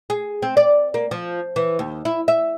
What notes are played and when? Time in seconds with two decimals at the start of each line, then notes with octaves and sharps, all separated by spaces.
0.10 G#4
0.42 C4
0.57 D5
0.94 A#3
1.11 F3
1.56 E3
1.79 D#2
2.05 E4
2.28 E5